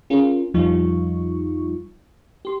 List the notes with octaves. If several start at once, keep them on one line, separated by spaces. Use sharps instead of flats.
C#4 F4 G#4 A#4
F2 F3 G3 D#4 F4 C#6
G4 C6